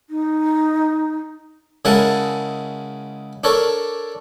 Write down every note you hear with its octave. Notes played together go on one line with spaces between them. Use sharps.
D#4
C#3 G#3 E4 A#4 F#5 A5
D4 A4 A#4 C#5